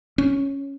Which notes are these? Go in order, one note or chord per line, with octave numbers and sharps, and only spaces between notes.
C#4